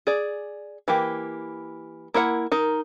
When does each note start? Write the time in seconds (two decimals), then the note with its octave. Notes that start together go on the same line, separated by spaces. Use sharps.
0.07 G#4 D5
0.88 E3 A#3 G4
2.14 A#3 E4 A#4 F#5
2.52 D#4 A#4